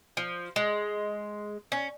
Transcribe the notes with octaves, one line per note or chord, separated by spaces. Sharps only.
F3
G#3
C#4